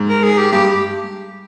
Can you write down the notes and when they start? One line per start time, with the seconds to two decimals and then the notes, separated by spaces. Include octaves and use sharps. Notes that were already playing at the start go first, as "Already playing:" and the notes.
Already playing: G#2
0.09 A#4
0.23 G#4
0.37 G4
0.52 G2 G4